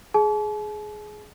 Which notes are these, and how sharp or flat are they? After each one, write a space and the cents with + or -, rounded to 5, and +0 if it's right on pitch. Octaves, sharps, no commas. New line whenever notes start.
G#4 +15 A5 -45